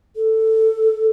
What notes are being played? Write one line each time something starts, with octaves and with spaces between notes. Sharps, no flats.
A4